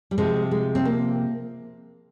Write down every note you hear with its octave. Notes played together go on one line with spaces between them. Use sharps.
G3
C3 F3 G#3
G#3
C4
A#3